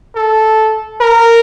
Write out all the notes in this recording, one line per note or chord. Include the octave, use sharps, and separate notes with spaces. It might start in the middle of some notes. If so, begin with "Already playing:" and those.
A4
A#4